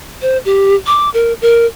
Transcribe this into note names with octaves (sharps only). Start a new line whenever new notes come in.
C5
G4
D6
A#4
A#4